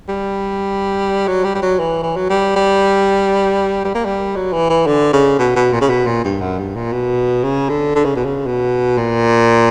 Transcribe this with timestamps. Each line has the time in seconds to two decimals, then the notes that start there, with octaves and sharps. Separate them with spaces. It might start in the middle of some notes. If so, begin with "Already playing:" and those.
0.08 G3
1.28 F#3
1.44 G3
1.55 G3
1.62 F#3
1.79 E3
2.03 E3
2.16 F#3
2.30 G3
2.56 G3
3.85 G3
3.95 A#3
4.05 G3
4.36 F#3
4.53 E3
4.69 E3
4.87 D3
5.13 C#3
5.39 B2
5.56 B2
5.73 A#2
5.81 C#3
5.89 B2
6.07 A#2
6.25 G2
6.41 F#2
6.59 G2
6.76 A#2
6.93 B2
7.44 C#3
7.69 D3
7.96 D3
8.05 C#3
8.16 B2
8.25 C#3
8.46 B2
8.98 A#2